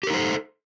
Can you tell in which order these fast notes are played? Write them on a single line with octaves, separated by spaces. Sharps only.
G4 A#4 D#4 C5 A4